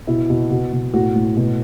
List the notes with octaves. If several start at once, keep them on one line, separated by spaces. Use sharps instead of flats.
B2 E4
B2
B2 F#4
B2
A2 F#4
A2
B2